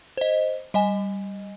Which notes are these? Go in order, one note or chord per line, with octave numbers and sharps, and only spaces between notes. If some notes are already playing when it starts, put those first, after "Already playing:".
C5 D#5
G3 D#5 G#5